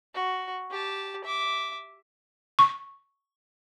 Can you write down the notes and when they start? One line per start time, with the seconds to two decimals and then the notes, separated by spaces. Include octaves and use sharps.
0.14 F#4
0.71 G4 A5
1.24 E5 D6
2.59 C#6